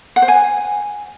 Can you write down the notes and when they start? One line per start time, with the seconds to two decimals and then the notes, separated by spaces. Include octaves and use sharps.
0.16 F#5
0.22 C5
0.28 G#5